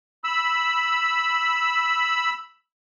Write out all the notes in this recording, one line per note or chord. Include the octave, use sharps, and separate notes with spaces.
B5 E6